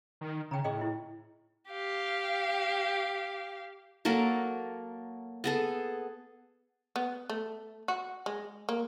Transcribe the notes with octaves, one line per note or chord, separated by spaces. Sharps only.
D#3
C#3 G5 A#5
A2 G#4 D#5 G5
E4
G4 F5
F#3 A#3 A4 A#4
B3 G#4 A4
B3
A3
F#4
G#3
A#3